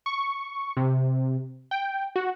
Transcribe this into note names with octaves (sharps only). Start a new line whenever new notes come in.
C#6
C3
G5
F#4